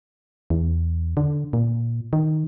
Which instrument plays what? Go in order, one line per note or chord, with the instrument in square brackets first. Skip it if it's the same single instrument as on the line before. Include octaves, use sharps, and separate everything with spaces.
[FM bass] E2
D3
A#2
D#3